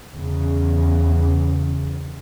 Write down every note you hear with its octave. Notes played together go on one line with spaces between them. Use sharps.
E2 C#3